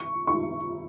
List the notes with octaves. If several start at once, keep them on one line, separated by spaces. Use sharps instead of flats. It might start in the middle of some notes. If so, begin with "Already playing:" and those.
Already playing: C#6
C#6